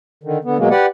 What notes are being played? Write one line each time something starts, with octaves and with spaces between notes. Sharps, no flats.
D3 D#3
D3 B3
B2 F#3 G#3 A#3
G4 B4 D5 F#5